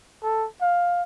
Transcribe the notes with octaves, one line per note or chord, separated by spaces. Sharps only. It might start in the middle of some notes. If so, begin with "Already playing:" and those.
A4
F5